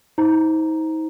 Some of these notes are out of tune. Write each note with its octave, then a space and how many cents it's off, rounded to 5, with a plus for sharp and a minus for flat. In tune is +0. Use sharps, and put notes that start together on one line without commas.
D#4 +40 C5 +0 A#5 +0